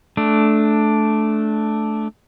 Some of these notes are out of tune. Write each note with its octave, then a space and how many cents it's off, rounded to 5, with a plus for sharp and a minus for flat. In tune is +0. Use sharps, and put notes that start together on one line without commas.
A3 -15 D4 +0